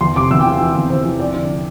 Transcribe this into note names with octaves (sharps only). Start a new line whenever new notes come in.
E2 C6
C3 D6
E2 E6
G5
E3 F5
E3
E2
E2 C5
E3
F2 D5
D3